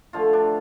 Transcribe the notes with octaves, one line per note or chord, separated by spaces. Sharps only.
D3 F3 A3 F4
D4